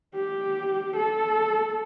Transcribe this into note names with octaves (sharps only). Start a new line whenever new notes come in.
G4
A4